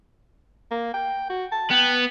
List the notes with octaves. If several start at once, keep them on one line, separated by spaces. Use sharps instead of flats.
A#3
G5
F#4
A5
B3 G5